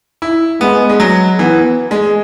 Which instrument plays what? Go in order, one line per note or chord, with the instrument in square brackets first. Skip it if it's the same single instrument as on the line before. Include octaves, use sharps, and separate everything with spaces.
[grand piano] E4
[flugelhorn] G#3 [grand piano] B3
[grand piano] G#3
F#3
[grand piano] E3 [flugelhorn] B3
[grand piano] G#3